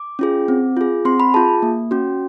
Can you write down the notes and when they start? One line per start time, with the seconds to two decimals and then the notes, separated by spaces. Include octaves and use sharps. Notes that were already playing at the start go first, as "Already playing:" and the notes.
Already playing: D6
0.19 C#4 F4 G#4
0.48 C4
0.77 F4 G#4
1.05 C4 C6
1.20 B5
1.34 F4 G#4 A5
1.62 A#3
1.91 C#4 F#4